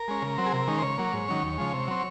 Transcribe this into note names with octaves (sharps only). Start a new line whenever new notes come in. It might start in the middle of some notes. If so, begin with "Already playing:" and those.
Already playing: A#4
G#3 C#4
C#3
F#3 C4
G#4
C3 A#4
D#3 G#3 C#4
C5
C#3 C#5
F#3 A#3
G#2
D#3 F#3 C#4
D#2
C#3 F3 G#3
C3
F#3 C4